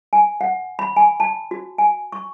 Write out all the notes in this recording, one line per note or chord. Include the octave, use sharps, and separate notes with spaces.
G#5
F#5
B5
G#5
A5
F#4
G#5
C#6